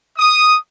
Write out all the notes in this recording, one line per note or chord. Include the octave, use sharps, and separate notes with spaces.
D#6